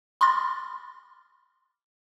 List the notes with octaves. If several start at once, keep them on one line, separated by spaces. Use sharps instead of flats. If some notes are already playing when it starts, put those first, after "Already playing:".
B5 C6 D6 F6 A6